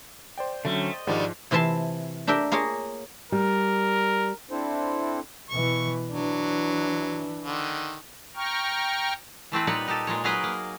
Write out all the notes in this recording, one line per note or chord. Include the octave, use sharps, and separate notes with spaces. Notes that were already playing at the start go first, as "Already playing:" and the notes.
C5 D5 G5
D3 F#3 A3 C#4
D#5
G#2 D3 D#3 F3 G3 G#3
C3 E3 F4 E5 A5 C6
D4 G4 A#4 E5 G5
A#3 F4 G#4 A#4 C#5
G3 A#4
C4 D4 E4 A4 C5
B2 E3 C#6
E3 F#3 D4
D3 D#3
G5 A#5 C#6 F6
E3 A3 C4 B4
A#2 G3 D#4 B4 C#5 F#5
D#4 G4 A4
A#2 G#3 C#5
F#3 D#4 G#4 A#4 B4 D#5
A#3